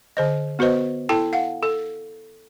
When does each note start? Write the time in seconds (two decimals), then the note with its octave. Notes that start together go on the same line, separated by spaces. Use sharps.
0.17 D3 C5 D#5
0.59 B3 F#4 B4 C5 D#5
1.09 E4 A4 G5 A5
1.33 F5 F#5
1.63 A4